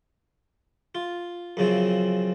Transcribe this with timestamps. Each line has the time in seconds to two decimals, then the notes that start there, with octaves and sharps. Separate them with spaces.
0.95 F4
1.57 F#2 C#3 F3 C4